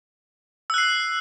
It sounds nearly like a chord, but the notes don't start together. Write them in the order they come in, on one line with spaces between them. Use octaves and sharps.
E6 F#6 C7